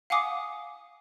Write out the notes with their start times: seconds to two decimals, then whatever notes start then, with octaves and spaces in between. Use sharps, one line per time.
0.10 F5 F#5 G#5 D6 D#6